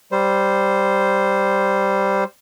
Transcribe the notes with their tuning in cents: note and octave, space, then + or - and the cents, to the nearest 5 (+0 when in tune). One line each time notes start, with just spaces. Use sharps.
G3 +0 C5 -5